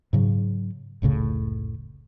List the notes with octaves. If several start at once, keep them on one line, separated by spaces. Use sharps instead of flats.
G#2 C#3 F#3
F1 C#2 A2 C#3